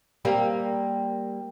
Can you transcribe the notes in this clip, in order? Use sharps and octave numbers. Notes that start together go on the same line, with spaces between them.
G3 A#3 C4